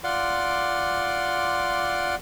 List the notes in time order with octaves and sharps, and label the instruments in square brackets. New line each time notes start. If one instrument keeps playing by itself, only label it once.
[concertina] F4 D5 F#5 C6 D6